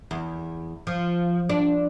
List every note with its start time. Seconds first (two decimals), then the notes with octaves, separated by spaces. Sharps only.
0.11 E2
0.87 F3
1.49 D4